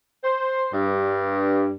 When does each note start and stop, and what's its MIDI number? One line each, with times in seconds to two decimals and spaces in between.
0.23 0.68 72
0.72 1.73 43